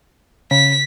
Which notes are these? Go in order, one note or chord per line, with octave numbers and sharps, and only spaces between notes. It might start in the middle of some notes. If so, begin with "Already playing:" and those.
C#3 B6